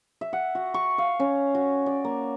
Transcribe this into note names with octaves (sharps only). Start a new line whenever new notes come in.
E5
F#5
F#4
C#6
F5
C#4
F#4
D5
A#3